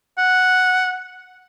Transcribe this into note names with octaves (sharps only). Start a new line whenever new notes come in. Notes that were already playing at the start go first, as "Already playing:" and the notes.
F#5